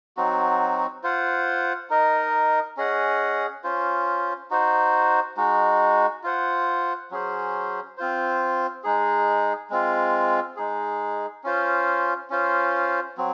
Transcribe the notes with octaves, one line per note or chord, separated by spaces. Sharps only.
F#3 C4 D#4 F#4
F4 C5 F#5
D#4 A#4 D#5
C#4 G#4 D#5 F#5
C#4 F4 C5
D#4 F#4 C5
G#3 D#4 F#4
F4 C5 F#5
F#3 C#4 G#4 C5
C4 F4 C5
G#3 D#4 G#4
G#3 C4 F4
G#3 D#4 G#4
C#4 F4 C5
C#4 F4 C5
F#3 C4